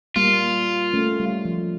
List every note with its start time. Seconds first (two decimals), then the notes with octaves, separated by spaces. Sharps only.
0.16 G3 A#3 F4
0.93 A3 C#4
1.20 G3
1.45 F3